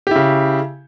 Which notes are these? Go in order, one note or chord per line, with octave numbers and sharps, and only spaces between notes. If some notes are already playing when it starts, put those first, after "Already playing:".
C#3 E4 G4